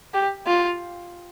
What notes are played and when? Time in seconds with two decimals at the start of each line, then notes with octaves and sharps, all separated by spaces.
0.14 G4
0.47 F4